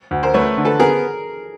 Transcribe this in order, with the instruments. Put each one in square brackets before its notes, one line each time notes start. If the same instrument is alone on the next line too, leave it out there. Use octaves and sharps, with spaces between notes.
[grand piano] D2
[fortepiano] A#4 C5
[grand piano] A3 [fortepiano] B4 C#5
[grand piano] D3
[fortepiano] A4 B4
[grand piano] B3 [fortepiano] G#4 A#4